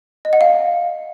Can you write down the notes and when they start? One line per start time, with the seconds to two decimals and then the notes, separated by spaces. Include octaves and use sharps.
0.25 D#5
0.33 F#5
0.41 F5